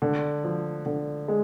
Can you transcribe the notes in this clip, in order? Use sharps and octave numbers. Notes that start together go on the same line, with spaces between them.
D3
F3
D3
G#3